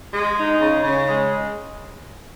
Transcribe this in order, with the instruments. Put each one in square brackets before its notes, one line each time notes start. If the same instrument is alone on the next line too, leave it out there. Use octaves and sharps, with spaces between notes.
[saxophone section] G#3
D#4
C#3
C#3
G#3